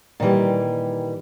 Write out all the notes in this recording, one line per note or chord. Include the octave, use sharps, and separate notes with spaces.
A#2 D#3 E3 G3